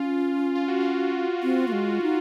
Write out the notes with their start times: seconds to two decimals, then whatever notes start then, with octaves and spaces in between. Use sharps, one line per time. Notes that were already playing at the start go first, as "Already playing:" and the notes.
Already playing: C#4 F4
0.55 F4
0.68 F#4
0.81 F4
1.43 C4
1.68 A#3
1.72 G#3
2.02 D#4